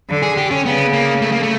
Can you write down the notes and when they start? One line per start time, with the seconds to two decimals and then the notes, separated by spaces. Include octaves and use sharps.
0.09 D3
0.23 G#4
0.37 G4
0.51 C#4
0.65 C#3 B3
0.93 A#3
1.22 A3
1.32 A#3
1.43 A3